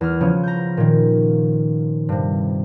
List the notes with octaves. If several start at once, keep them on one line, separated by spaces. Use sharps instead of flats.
E2 F6
C#3 F3 B3 C#4
A#5 G6
A#2 D#3
G2 C3